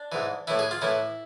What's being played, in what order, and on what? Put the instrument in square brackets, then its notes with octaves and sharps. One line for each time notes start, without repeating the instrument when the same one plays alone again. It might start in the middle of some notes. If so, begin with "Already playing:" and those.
Already playing: [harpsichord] D4
G#2 E3
A2 E3 E4
G#4
F4
A2 E3 E4